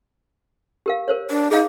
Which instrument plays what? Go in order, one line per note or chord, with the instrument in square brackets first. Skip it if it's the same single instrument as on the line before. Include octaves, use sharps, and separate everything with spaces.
[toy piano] G4 A#4 F5
A#4 C5 C#5
[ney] D4
[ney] D#4 [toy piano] G#4 F5